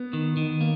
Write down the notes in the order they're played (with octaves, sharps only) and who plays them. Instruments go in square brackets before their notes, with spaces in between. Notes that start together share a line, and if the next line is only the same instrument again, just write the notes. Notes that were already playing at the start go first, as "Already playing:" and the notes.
Already playing: [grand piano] B3
[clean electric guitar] D#3
D#3
A#3